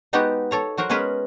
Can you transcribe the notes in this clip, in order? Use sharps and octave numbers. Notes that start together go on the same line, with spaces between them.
G#3 B3 D#4 F#4 G4
A4 C#5 A#5
F#3 F#4 A#4 C5
G#3 B3 C#4 G#4 A#4 B4